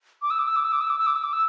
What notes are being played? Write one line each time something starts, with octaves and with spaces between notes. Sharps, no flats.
D6
E6
D6
E6
D6
E6
D6
E6
D6
E6
D6
E6
D6
E6